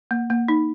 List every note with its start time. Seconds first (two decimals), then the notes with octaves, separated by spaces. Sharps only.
0.11 A#3
0.30 A#3
0.48 D#4